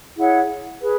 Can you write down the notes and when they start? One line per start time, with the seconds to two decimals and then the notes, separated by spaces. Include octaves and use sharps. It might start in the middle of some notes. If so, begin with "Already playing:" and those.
0.15 E4 G#4 C#5 F#5
0.81 G#4 B4